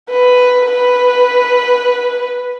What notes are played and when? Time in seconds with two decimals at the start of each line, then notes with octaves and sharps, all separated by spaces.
0.11 B4
0.69 B4